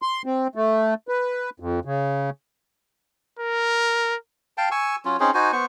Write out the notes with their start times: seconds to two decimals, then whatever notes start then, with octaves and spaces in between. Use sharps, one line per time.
0.02 C6
0.26 C4
0.55 A3
1.08 B4
1.60 F2
1.85 C#3
3.39 A#4
4.58 F5 G5 A5
4.71 G#5 C#6 E6
5.05 F#3 C#4 F4
5.20 C4 C#4 D#4 G#4
5.34 D#4 F#4 C5 G#5
5.53 B3 C5 C#6